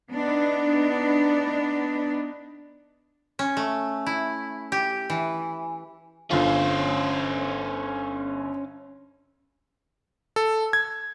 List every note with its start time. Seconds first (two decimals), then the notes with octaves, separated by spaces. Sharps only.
0.12 B3 D4 D#4
3.39 C#4
3.57 A3
4.06 E4
4.72 G4
5.10 E3
6.30 G1 C#4 F4 C5
10.36 A4
10.73 G#6